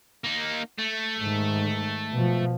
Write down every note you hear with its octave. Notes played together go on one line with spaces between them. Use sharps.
A#3 D#4
A3
G#2 D#3
B2 F3